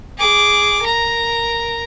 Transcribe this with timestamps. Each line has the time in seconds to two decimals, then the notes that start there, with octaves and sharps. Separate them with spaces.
0.17 G#4 D6
0.82 A#4 A#5